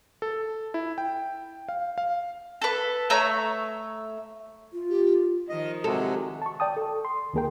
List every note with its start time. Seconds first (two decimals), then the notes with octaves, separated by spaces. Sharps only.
0.22 A4
0.74 E4
0.98 G5
1.69 F5
1.98 F5
2.62 A4 B4
3.10 A3 C#5 A#5 E6
4.73 F4
4.90 G4
5.49 D#3 F3 D#5
5.84 C3 F#3 G#3 A4
6.42 A5 C#6
6.60 D5 G5 A5 D#6
6.77 A4
7.05 C6
7.33 D2 D#3 A#3 G#4 A#4 G5